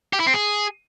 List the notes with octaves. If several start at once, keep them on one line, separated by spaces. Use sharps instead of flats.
G4
E4
C4
G#4